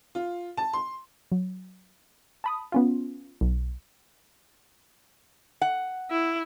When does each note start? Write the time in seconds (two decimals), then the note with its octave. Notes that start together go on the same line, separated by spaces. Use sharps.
0.15 F4
0.57 A5
0.73 C6
1.32 F#3
2.44 A5 B5 D#6
2.72 B3 C#4 F4
3.41 B1
5.61 F#5
6.11 E4